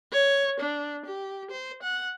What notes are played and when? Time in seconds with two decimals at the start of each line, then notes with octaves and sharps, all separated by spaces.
0.12 C#5
0.60 D4
1.06 G4
1.51 C5
1.83 F#5